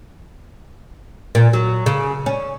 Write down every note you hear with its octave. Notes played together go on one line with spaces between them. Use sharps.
A#2
F#3
C#3
C#4